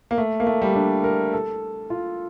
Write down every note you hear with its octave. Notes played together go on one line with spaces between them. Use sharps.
A#3
A3
A#3
A3
G3
D4
A#4
A4
F4